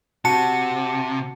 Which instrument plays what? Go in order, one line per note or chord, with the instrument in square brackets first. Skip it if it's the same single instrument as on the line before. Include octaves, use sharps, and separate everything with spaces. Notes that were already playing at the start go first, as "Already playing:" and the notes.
[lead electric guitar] C3 [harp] F#4 [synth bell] A5 C#7